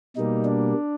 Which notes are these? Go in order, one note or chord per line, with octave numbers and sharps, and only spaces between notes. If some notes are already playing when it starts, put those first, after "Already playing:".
B2 G3 A#3 D#4
D4